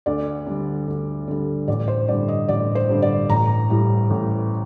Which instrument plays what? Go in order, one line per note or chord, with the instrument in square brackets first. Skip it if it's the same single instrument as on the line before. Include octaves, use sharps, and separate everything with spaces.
[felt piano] D2 D5
D3 G3
D2
D3 G3
A1 D5
C5
G2 D3 G3 D5
D#5
A1 D5
C5
G2 D3 G3
D5
A1 A#5
A2 G3
A1